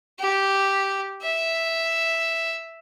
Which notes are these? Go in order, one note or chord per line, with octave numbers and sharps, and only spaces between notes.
G4
E5